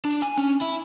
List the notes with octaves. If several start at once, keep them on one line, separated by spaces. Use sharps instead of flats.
D4
G#5
C#4
E4